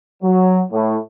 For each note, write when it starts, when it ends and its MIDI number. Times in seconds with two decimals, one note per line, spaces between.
0.22 0.62 54
0.71 0.97 45